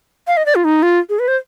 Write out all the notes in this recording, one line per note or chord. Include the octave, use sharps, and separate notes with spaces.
F5
D#5
D5
F4
D#4
F4
G#4
B4
C5